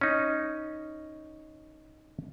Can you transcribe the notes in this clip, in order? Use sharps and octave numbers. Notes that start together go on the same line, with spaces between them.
C#4 D#4